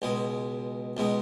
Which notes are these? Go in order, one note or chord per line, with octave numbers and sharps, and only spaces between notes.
C#2 B2 G#3
C#2 B2 G#3